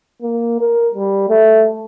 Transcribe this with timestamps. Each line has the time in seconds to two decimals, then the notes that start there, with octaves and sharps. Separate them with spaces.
0.22 A#3
0.61 A#4
0.94 G3
1.29 A3